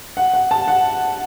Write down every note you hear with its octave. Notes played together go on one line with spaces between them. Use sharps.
F#5
F#5
A5
F#5